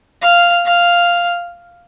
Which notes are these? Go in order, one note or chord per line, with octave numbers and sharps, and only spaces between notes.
F5
F5